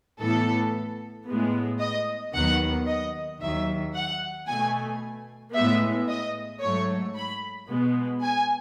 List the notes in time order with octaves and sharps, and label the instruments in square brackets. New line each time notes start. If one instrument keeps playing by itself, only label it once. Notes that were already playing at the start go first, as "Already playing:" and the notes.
[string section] A2 E3 B3 A4
A2 G#3 B3
D#5
D#2 D#3 F#3 B3 F#5
D#5
D#2 D#3 F#3 E5
F#5
B2 A3 G#5
A2 G#3 B3 E5
D#5
G#2 F#3 A3 C#5
B5
B2 G#3 B3
G#5